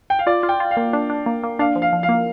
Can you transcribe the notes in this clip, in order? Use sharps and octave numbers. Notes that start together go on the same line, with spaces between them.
G5
F5
F4 D5
F4
G5
F4
F5
A#3
D4
D4
A#3
A#3
D4 F5
F3
F5
F3
F5
A#3